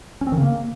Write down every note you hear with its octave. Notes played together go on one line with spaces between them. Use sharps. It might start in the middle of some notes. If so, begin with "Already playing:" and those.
C#4
C4
D#3
C#3
A#3